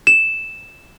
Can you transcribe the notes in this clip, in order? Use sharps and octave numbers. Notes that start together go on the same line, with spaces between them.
E7